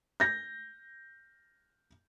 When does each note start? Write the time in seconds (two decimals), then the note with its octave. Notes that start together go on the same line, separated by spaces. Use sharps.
0.20 G6 A#6